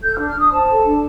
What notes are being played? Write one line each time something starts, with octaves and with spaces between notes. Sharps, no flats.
A4 G6
F6
D4
F6
D4 D#6
C5 A5
A4
D4